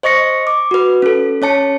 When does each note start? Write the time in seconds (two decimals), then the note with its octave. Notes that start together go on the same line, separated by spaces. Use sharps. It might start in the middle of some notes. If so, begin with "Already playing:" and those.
0.03 C5 D#5 C#6 A#6 C#7
0.47 D6
0.71 F#4 B4
1.02 C#4 A4
1.42 C#4 C#5 A5 C#7